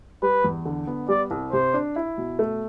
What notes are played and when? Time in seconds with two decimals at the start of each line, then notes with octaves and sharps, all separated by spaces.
0.22 G3 B4
0.44 E2
0.65 D3
0.87 B3
1.08 G3 D5
1.31 C2
1.52 C3 C5
1.74 D4
1.96 E4
2.18 B2
2.39 A3